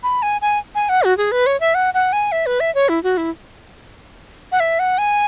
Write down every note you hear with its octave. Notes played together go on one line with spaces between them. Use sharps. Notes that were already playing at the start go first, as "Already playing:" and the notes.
B5
G#5
G#5
G#5
F#5
F#4
G#4
B4
C#5
E5
F#5
F#5
G#5
E5
B4
E5
C#5
E4
F#4
E4
F#5
E5
F#5
G#5